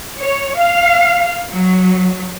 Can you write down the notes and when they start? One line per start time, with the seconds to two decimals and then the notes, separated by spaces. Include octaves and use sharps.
0.22 C#5
0.59 F5
1.51 F#3